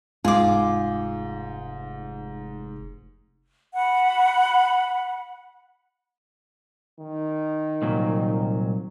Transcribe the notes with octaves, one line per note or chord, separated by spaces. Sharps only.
F1 G#2 F4 G#4 D6
F#5 B5
D#3
C2 A#2 F#3